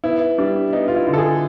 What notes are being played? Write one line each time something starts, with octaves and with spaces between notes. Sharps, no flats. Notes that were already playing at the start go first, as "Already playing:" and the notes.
B3 E4
G3 D4
B3 D#4
F4
E4
D3
A4
G#4